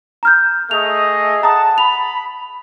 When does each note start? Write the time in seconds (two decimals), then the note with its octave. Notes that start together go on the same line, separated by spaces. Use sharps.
0.23 A#5 F6 G6
0.71 A3 G#4 D#5 F7
1.43 F#5 A5 A#5 D#6
1.78 B5 F7